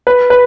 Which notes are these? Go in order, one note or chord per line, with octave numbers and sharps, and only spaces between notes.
B4
B4